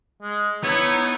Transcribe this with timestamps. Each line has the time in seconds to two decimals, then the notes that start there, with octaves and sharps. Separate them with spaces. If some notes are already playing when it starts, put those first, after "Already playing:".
0.22 G#3
0.63 B3 D#4 E4 C#5